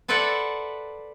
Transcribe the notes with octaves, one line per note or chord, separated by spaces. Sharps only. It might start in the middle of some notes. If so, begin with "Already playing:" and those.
A4 B4 C5 D5 E5 F#5